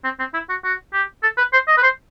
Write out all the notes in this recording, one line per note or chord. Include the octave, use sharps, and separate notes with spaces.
C4
C4
E4
F#4
F#4
G4
A4
B4
C5
D#5
B4
C5